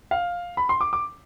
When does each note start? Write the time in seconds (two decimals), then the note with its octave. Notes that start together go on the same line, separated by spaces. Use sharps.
0.11 F5
0.57 B5
0.69 C6
0.81 D6
0.93 D6